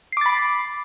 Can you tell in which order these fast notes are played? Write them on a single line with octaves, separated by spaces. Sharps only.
C7 D6 A6 B5